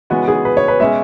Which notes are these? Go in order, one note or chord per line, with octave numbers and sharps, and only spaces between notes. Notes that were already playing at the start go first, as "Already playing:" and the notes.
C#3 E3 G#3 B3 F#4
G#4
B4
C#5
B4
B2 G#3 C#4 E5